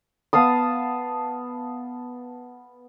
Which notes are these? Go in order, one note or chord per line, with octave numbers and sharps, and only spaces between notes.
B3 F5 A5 D#6